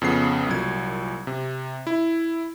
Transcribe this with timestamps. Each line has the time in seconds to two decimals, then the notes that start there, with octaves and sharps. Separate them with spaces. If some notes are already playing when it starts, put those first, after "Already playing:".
0.02 F2 C#3 B3 C7
0.47 C2 A#2 F#3 G#6
1.27 C3
1.87 E4